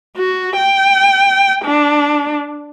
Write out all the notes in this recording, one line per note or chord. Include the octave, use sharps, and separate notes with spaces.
F#4
G5
D4